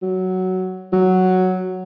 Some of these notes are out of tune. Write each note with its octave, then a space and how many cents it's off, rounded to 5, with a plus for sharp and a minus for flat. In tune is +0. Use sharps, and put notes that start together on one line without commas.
F#3 +5
F#3 +0